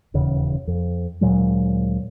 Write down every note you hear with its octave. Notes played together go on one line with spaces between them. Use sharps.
D#1 E2 C#3
F2
D2 A#2 F#3 G#3